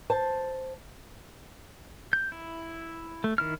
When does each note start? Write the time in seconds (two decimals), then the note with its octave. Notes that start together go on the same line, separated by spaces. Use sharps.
0.10 C5 A5
2.13 G6
2.32 E4
3.24 A3
3.38 D#3 E4 F6